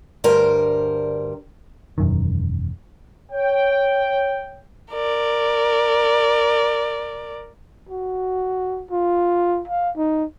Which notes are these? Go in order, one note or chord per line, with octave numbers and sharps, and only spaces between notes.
D2 G2 G3 A#4 C5
E1 F#2 D#3
C#5 G5
A#4 D5
F#4
F4
F5
D#4